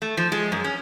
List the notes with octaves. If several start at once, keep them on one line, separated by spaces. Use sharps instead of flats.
A3
F3
G#3
F#2
C#4